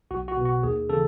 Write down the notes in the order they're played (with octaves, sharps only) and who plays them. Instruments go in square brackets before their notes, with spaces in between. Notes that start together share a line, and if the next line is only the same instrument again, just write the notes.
[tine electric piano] B1 F#4
F#4
B2
F#4
D#2 G#4
C#3 E3 A4